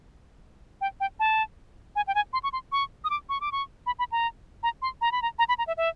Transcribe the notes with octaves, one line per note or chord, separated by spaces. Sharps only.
G5
G5
A5
G#5
G5
G#5
C6
C#6
C6
C#6
D#6
D6
C#6
D6
C#6
B5
B5
A#5
A#5
C6
A#5
B5
A#5
A#5
B5
A#5
E5
E5